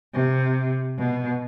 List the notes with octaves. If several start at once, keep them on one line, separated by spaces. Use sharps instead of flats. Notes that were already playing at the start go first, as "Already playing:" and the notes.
C3
B2